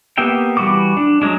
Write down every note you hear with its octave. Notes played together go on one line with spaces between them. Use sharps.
A#3 B3 G4 E5 G5
E3 G3 F#4 C#6 D6
D4
F#3 G#3 D4